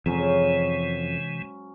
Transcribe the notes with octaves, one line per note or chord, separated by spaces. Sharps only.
F2 G#2 C3 E3 F#3 G#3 C#4